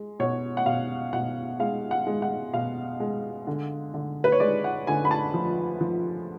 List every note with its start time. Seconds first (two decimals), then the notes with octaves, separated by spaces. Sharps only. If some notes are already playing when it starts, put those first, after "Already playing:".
Already playing: G#3
0.20 B2 C#5
0.57 F#5
0.66 B2 F5
1.13 B2 F#5
1.60 G#3 F5
1.91 F#5
2.07 G#3
2.22 F#5
2.53 B2 F5
3.00 G#3
3.47 D3
3.94 D3
4.24 B4
4.32 C#5
4.40 G#3 D5
4.64 F#5
4.87 D3 G#5
5.05 B5
5.11 A5
5.34 F3
5.81 F3